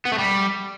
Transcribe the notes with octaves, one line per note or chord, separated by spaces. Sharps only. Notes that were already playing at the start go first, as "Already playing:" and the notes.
B3
A3
G3